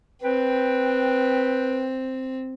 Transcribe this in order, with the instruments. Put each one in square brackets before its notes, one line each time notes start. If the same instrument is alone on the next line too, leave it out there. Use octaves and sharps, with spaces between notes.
[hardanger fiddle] C4 [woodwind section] B4 G5